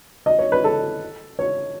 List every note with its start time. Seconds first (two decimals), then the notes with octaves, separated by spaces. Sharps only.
0.26 D#5
0.39 C#5
0.52 B4
0.64 A4
1.39 C#5